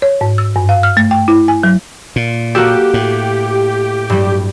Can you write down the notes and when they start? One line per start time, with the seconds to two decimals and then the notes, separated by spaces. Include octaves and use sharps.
0.02 C#5
0.21 G#2
0.38 E6
0.56 G2
0.69 F5
0.83 F6
0.97 A3
1.11 G5
1.28 E4
1.48 G#5
1.63 F#3
2.16 A#2
2.55 A#3 F#4 G4 A4
2.94 A2
4.10 G2 G3